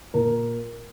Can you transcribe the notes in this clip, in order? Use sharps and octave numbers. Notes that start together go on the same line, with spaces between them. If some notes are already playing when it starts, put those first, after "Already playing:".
A#2 A#4